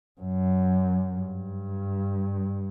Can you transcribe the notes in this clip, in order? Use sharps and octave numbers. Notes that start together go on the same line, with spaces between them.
F#2
G2